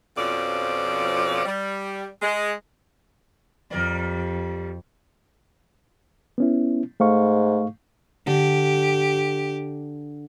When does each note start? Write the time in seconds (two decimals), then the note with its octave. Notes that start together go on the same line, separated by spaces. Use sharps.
0.17 F2 B2 F3 C#4 D5
1.46 G3
2.22 G#3
3.71 F2 G3 A#4 D5
6.38 B3 C#4 E4
7.00 G#2 A3 F5 C#6
8.27 D3 G4